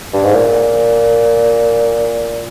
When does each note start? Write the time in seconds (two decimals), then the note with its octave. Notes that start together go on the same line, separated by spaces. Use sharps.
0.13 G2
0.23 G#2
0.34 A#2